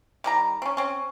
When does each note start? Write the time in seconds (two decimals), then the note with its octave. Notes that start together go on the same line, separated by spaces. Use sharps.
0.24 D#3 G3 A#5
0.62 C4 C#4
0.77 C4 C#4